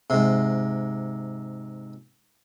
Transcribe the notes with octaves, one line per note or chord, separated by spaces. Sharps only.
G#2 C3